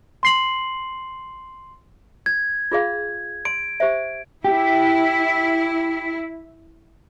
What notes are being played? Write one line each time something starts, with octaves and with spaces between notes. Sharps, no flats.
C6 C7 F#7
G#6
F4 G#4 F5
C6 D7
G4 C5 E5
E4 G4